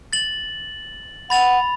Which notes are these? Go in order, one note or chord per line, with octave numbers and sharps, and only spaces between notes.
A6 F#7
F#5 B5 A6 F7